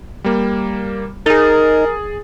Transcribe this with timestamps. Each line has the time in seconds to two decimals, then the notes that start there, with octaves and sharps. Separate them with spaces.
0.24 G3 A#3
1.26 D#4 G#4 A#4 A6